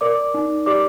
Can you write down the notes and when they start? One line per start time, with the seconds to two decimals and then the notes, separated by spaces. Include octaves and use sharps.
0.01 A#4 D5 D6
0.34 D#4
0.66 G4 D5 D6